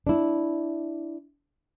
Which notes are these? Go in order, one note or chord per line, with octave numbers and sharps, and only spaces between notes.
D4 E4